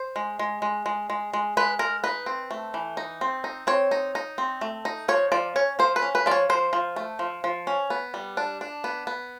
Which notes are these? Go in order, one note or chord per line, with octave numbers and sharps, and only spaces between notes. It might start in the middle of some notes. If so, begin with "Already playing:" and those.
Already playing: C5
G#3
G#3
G#3
G#3
G#3
G#3
G#3 B4
G#3 A#4
D#4 B4
C4
A3
E3
D#4
C4
D#4
C4 C#5
D#4
D#4
C4
A3
D#4
F3 C#5
F3 D5
C#4 C#5
F3 C5
B4
C#4
B4
F3 D5
C#5
F3 C5
F3
A3
F3
F3
C#4
B3
G3
D4
D4
B3
B3